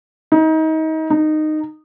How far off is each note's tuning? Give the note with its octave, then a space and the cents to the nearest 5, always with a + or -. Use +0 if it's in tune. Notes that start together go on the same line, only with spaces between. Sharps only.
D#4 +30
D#4 -15